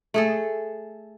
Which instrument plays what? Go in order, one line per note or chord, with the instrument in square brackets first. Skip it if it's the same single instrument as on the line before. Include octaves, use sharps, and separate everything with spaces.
[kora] A3 G#4 A4